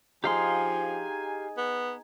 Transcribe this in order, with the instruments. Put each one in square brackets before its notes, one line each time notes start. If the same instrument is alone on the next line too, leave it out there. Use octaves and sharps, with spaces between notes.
[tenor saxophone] F3 [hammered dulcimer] D#4 G#4 [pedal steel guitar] G4 F5 C6 [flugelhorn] G#5
[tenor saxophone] B3